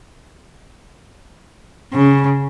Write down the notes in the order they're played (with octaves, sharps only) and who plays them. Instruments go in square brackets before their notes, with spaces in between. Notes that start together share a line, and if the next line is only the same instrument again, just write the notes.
[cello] C#3